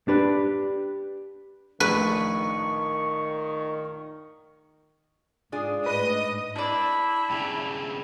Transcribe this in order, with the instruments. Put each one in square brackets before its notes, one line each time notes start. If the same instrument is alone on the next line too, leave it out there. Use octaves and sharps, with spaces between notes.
[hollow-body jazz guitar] D4 G4 B4
[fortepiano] A#1 A2 [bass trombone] D#3 [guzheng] B4 [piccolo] C#6
[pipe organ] G#2 [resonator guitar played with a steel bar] D4 F4 G#4
[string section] A2 D#5 D#6 [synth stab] B4
[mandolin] D4 D5 [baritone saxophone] E4 [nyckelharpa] B5
[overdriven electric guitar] G2 C#3